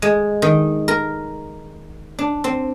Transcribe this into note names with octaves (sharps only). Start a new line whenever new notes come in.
G#3
D#3
A#4
D4
C4